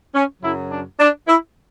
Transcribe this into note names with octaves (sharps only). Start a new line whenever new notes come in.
C#4
F#2 C#3 F#3 E4
D4
D4
E4